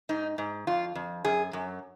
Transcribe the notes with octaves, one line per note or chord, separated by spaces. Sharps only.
G#2 D#4
G#2
F2 F4
F2
F#2 G#4
F#2